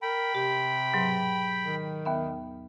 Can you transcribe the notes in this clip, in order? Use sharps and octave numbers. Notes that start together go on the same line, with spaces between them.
A#4 G5 B5
C3 G4
G#2 B2 F#3
D#3
D#2 B3 E5